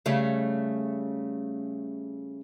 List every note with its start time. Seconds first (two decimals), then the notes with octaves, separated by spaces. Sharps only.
0.06 C#3 G3 A3